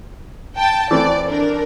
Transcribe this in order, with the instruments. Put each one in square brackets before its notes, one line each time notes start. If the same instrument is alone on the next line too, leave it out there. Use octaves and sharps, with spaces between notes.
[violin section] G5 A5
[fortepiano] E3 A3 C4 [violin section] D5
[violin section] D4 A#4